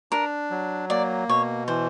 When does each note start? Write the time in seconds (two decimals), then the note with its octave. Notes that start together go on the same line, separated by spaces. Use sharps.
0.12 D4 A#4
0.51 F#3
0.90 A#3 D5
1.29 B2 C#5
1.68 E3 C5